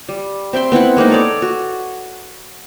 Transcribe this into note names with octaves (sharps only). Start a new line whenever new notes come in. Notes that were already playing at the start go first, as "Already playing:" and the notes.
G3
C4 E5 G5 C6
B3 C4 E4 F#5
G#3 A#3 C4 D#4
A4 C#5 D5
F#4